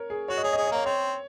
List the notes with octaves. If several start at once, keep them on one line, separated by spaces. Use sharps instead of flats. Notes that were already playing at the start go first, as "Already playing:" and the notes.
Already playing: A#4 C#5
G#4
F#4 C#5
D#5
G#4 C#5
D#5
G#4 C#5
D#5
A#3 C#5
C4 C#5